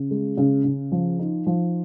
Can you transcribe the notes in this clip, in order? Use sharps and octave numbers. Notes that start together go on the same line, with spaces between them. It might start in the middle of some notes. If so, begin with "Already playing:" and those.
Already playing: C#3
G#3
C#3
C#3
F3
D#4
F3